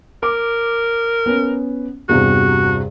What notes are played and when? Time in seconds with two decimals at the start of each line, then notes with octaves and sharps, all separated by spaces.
0.23 A#4 D6
1.26 B3 C#4
2.09 E2 G2 C3 F#4